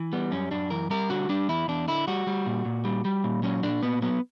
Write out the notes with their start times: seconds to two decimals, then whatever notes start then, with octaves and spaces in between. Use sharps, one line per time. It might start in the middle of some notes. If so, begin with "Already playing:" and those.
Already playing: E3
0.13 G3 B3
0.32 F#2 C#4
0.51 F#2 D4
0.70 E3 A#4
0.90 G3 A#4
1.10 D3 F#4
1.29 G3 D4
1.48 E2 E4
1.68 E2 D4
1.88 D3 E4
2.07 G3 F#4
2.27 G3
2.46 A#2
2.65 A#2
2.85 G3
3.05 G3
3.24 A#2
3.43 F#3 C#4
3.63 A#2 D4
3.83 A#2 B3
4.02 F#3 B3